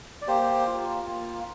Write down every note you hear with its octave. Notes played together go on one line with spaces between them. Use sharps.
D5
A#3 G4 C5
F4
A#3